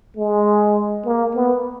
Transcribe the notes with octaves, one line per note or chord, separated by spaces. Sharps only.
G#3
A#3
B3